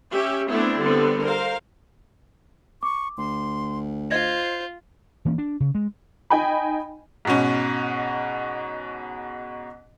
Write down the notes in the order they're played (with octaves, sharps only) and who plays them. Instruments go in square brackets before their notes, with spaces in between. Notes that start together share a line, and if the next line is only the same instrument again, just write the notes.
[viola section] C#4 G4 E5
A3 B3 C4 D4 E4
D3 G3 B3 C4
A#4 C5 F5
[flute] C#6 [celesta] D6
[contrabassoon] D2 [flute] C6
[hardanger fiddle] F4 [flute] C5 [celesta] D#5 G#6 A#6
[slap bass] E3 A#3 C#4
D4
C#3
G#3
[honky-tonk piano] D#4 D#5 G5 G#5 B5
[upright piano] G#2 B2 C#4